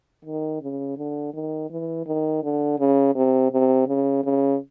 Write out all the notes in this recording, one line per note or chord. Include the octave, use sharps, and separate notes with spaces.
D#3
C#3
D3
D#3
E3
D#3
D3
C#3
C3
C3
C#3
C#3